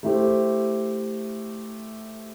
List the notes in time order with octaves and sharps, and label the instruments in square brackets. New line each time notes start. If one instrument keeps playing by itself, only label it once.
[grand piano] A3 E4 G4 C5